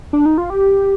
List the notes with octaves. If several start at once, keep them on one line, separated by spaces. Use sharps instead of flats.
D4
D#4
F4
G4